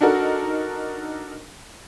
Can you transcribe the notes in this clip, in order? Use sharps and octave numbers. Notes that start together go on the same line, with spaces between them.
D4 D#4 F#4 A4 A#4